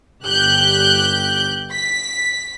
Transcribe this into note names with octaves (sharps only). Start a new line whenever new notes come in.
G1 G4 F#6 G6
B6